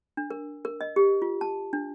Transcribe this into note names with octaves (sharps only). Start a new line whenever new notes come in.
D4
A#4
A#4
D#5
G4
F4
A5
D4